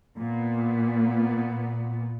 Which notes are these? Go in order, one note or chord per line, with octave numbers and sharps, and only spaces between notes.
A#2 B3